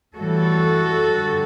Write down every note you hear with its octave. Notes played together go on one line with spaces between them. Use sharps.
A2 E3 G3 F#4 A4
G2 D3 G3